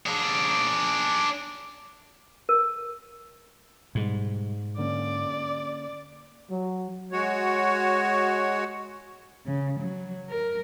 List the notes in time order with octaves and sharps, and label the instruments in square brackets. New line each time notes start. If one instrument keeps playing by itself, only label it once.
[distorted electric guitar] D4 G#4
[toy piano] A#4
[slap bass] G#2 [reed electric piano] B2 G3
[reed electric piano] D3 A#3 C#4 [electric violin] D5
[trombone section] F#3
[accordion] G#3 F#4 C#5
[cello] C#3
F#3
A#4